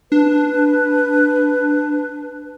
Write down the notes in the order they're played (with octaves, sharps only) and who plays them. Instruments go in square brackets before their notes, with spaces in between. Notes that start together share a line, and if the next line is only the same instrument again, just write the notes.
[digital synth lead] D4 [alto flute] B4